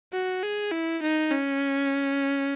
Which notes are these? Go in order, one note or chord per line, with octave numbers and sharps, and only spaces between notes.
F#4
G#4
E4
D#4
C#4